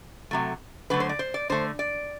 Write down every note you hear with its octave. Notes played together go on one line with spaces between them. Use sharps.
C3 F#3 A3
D3 F#3 A3 B4
C5
D5
C5
D5
D3 A3 C5
D5